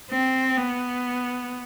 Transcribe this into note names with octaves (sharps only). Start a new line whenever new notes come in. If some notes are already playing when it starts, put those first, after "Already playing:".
C4
B3